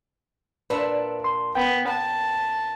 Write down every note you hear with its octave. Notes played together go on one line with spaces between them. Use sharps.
A#2 D4 B4 E5
C6
B3 G5
A5